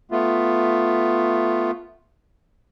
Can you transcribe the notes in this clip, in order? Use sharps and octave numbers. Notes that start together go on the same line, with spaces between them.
A3 B3 F4